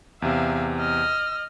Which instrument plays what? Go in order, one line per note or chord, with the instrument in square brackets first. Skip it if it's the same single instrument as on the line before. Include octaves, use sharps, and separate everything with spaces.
[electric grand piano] E2 C3 [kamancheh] E5 F5
[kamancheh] D#5 F6